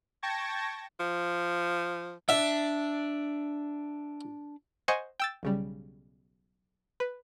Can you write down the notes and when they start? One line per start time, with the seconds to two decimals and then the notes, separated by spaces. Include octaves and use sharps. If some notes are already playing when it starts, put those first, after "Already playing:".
0.22 G5 A5 C#6 G#6 A#6
1.00 F3
2.29 D4 E5
4.88 C5 D#5 F#5 G#5 C#6
5.20 G5 E6 A6
5.43 B1 C#3 G3
7.00 B4